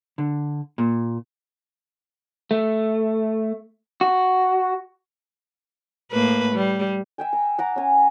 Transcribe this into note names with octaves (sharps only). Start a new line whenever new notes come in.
D3
A#2
A3
F#4
A2 A#3 B4
G3
E5 G5 G#5
A#5
F#5 A#5 D6
C#4 G#5